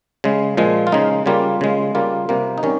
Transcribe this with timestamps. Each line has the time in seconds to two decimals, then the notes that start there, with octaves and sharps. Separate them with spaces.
0.24 C#3 G#3
0.57 A#2 F3 G#3
0.87 F4
0.92 C#3 G#3 D#4
1.26 C#3 G3 A#3 F4
1.61 C#3 G#3
1.95 C#3 G3 A#3 F4
2.29 C3 G3 A#3
2.58 D#4
2.63 D#3 G3 C#4